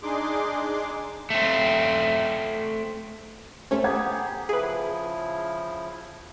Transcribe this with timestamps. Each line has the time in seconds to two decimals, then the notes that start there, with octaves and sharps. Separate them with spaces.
0.03 D4 D#4 G#4 C6 D6
1.30 A3 C4
3.71 A3 C#4 C5
3.84 B3 G4 G#4 F#5 A#5 G#6
4.49 C#3 F3 E4 G#4 B4